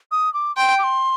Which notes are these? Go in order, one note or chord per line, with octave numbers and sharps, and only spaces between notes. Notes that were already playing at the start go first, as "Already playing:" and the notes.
D#6
D6
G5 C6
D6
C6